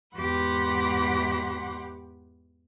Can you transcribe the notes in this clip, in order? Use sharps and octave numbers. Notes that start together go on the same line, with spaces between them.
E2 G#2 G4 F#5 B5 C6